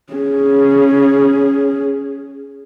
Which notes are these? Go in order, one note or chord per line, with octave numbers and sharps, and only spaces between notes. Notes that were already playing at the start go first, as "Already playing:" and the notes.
C#4 G#4